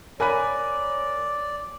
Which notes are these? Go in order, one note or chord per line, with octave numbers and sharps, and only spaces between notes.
A#4 C#5 D5 G#5 B5 F#6 D#7